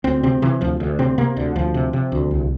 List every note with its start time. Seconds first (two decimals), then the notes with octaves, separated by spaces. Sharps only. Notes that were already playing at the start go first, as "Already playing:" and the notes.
0.04 D2 C4
0.23 C3 C4
0.42 C3 E3
0.61 D2 F3
0.80 D2
0.99 C3 C4
1.18 C3 A#3
1.36 D2 D3
1.55 D2 F3
1.74 C3
1.93 C3
2.12 D2
2.31 C2